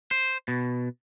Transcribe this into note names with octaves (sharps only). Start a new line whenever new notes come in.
C5
B2